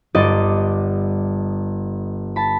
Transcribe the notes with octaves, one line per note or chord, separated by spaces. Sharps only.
G1 G3 D5 D#5 A6
A5 B5